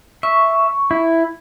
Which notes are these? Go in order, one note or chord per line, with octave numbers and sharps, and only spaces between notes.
E5 C#6
E4